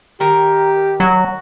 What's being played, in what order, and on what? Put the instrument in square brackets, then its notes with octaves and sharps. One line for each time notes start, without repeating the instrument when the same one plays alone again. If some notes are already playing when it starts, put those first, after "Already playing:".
[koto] D#3 A#4 [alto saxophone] G4
[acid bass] F#3 [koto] F#4